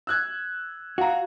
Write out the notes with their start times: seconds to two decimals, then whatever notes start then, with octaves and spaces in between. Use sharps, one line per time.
0.07 E6 F#6 G#6
0.98 F#4 F5 A#5